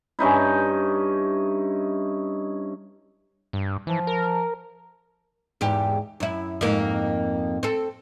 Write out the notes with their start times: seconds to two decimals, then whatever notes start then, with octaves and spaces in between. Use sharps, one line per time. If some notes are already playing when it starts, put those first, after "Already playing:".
0.19 G2 C#4 D#4 E4
3.53 G2
3.87 E3 F3
4.07 A#4
5.61 E2 G#2 G4
6.20 F#2 E4
6.61 F2 G#2 A#3
7.63 C4 A4